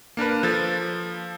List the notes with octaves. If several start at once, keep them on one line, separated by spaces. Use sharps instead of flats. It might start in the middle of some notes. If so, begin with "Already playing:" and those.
A#3 D4 A#4 B4
F3 A4 A6